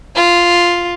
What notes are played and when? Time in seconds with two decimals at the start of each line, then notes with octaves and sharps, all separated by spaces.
0.16 F4